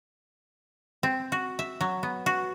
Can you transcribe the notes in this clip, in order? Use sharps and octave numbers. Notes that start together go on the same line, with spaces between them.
C4
F#4
E5
F#3
B3
F#4